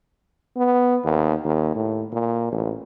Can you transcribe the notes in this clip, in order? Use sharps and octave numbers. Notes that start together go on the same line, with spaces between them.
B3
D#2
D#2
A2
A#2
A1